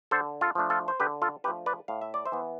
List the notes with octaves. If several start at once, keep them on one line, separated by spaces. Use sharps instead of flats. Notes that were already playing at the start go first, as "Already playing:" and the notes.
D3 A4 C5
F4 A4
F3 A3 D4
F4 A4
C5
D3 G4 B4
F4 A4
F3 A3 D4 G4 B4
B4 D5
A2 F5
E5
D5
C5 E5
E3 B3